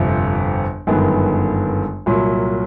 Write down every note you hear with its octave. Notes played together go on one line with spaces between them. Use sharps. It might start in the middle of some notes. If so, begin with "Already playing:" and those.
Already playing: G1 F2 C3
G1 F#2 D#3 G#3 B3
C2 A#2 F#3